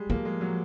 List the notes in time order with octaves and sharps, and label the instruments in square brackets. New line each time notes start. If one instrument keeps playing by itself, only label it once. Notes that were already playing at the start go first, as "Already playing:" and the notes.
Already playing: [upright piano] G3 G#3
[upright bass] F3 [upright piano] A#3
[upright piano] G#3
F#3